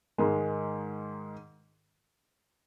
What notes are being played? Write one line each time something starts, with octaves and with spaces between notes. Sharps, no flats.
G#2 D#3 G#3